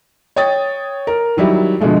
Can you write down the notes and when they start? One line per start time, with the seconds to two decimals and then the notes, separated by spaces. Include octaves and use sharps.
0.36 C#5 G5 D#6 A6
1.07 A#4
1.37 D#3 F#3 G3 E4
1.80 B2 D3 F3 G#3 A3